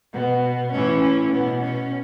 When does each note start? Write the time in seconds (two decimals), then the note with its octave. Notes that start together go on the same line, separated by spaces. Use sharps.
0.12 B2 B3
0.72 A2 E3 C#4
1.02 C#4
1.32 B2 B3
1.62 C#4